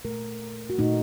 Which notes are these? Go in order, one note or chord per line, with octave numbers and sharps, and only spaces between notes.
A#2 A3 A#4
F#4
A#2 A3 D#4